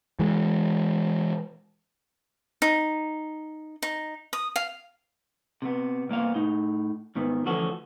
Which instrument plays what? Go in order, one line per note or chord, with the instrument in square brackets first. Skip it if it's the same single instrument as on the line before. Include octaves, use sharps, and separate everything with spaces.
[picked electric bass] E3 G#3
[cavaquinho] D#4
D#4
D#6
F5
[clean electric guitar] C3 B3
C2 A#3 B3 F5
A2 D#4
G#2 D#3 B3
D2 E3 F3 C#4 F#4 A4